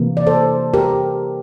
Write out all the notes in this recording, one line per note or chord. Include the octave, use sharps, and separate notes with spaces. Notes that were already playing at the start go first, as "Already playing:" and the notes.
Already playing: C3 E3 A#3
D5
A4 C5
G4 A#4